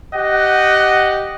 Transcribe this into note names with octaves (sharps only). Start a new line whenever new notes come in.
G4 D#5 F#5